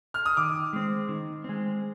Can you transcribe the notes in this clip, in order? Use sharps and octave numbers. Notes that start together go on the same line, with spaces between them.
F6
D#6
D#3 D6
G#3 C4
D#3
G#3 C4